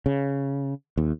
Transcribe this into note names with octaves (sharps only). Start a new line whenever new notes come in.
C#3
D#2